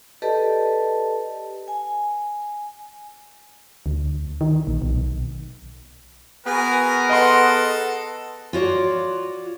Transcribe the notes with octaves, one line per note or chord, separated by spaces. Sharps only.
G4 A4 B4 D5 D#5 A5
G#5
D2
D#3
A#1
B1
B3 F#4 G#4 A#4 B4 G#5
A4 D#5 F#5 C6
F4 F#4 C#5 D5